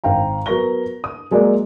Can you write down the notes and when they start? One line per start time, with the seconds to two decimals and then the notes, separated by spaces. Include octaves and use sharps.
0.04 G#1 F5 G5 A#5
0.46 F#3 B3 A#4 C#6 A#6 G7
1.04 D#6
1.31 F#3 G#3 A#3 D5